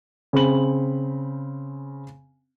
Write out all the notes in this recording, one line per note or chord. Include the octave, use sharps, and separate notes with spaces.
C#3 C4 B5 F#7